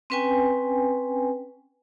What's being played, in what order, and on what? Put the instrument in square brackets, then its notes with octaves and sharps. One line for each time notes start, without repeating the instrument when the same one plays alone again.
[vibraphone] C4 C#4 B4 G5 G#5